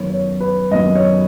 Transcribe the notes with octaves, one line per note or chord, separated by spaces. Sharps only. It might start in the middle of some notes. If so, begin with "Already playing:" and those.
Already playing: F#2 D#3 B3 C#5
C#5
B4
F#2 D#3 B3 D#5
C#5